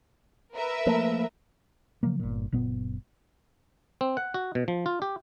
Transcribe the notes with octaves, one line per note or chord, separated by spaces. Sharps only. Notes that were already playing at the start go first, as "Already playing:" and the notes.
A#4 B4 E5
F3 A3 A#3
C#3 F3 F#3 A#3
G1 A#2
F#1 A#2 B3
C4
F#5
F#4
B2
F3
F4
G4